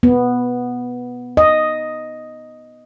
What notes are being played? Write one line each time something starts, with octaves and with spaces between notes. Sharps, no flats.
B3
D#5